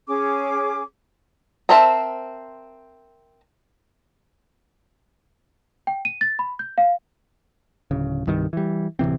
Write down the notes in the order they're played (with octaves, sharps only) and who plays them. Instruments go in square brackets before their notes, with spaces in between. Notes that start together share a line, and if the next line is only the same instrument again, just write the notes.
[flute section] C#4 G#4 D6
[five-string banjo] C4 A#4 C5 E5 A5
[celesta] G5
D#7
A6
B5
G6
F5
[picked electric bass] D1 C#3
C2 G2 D#3
E3 G3
D1 C3 E3 C4